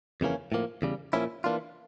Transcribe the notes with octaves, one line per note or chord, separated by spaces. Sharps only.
F2 C#3 E3 A#3 C#4
A2 F3 A#3
E2 C#3 G3
A#2 F3 A#3 C#4 E4
E3 A#3 D4 F4